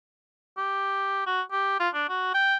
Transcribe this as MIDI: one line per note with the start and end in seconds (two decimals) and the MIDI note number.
0.57 1.25 67
1.26 1.42 66
1.51 1.77 67
1.80 1.89 65
1.94 2.04 62
2.09 2.29 66
2.34 2.57 79